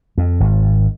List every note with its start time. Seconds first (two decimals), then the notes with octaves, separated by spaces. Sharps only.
0.18 F2
0.40 G#1